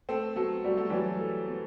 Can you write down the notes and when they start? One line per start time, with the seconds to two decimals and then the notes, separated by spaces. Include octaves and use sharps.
0.09 A3 C4 A4
0.36 F#3 A3 B3
0.64 G3 F#4
0.77 A3
0.90 E3 F#3 G3
1.20 A4
1.47 B3